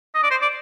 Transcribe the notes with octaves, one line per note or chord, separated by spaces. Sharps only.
D#5
D5
C5
D5